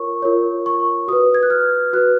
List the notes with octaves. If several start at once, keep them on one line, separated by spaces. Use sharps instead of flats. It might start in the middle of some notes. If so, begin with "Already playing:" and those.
Already playing: F4 A#4 C#5 C#6
F4 A#4 C#5
C#6
F#4 B4 D#6
G#6
F#6
F6
F#4 B4 F#6